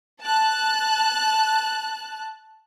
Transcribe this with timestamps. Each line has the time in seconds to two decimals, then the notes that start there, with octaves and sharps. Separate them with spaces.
0.22 A5 F#6